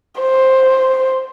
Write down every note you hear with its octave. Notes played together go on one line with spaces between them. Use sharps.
C5